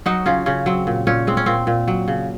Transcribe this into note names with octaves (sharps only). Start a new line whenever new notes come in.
F#3 D#4 F#4
C#3 C#4 F4
C#3 C#4
F#3 C4
A#2
A#2 C#4
G#3 C4
C#4
A#2 C4
A#2
F#3
C#3